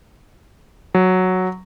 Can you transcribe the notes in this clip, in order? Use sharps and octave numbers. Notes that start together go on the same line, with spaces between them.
F#3